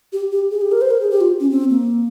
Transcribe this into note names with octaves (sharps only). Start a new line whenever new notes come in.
G4
G4
G#4
G4
A#4
C5
A#4
G#4
G4
F4
C#4
C4
A#3